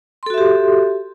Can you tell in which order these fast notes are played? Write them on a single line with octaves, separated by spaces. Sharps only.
C6 A4 F#4 E5 G4